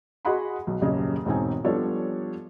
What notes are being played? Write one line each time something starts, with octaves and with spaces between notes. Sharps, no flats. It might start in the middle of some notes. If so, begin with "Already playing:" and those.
F#4 G#4 D#5 F#5 B5 C6
B1
D#1 F#2 C#3 G#4 D#5
E1 G#2 C4 D#4 G#5
F3 G3 B3 D4 A4 C#5